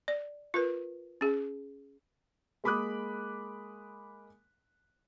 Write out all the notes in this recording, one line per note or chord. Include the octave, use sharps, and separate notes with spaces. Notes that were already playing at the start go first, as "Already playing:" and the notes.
D5
F4 A#4 B4
C#4 G#4
G#3 A#3 B5 D6 D#6 F#6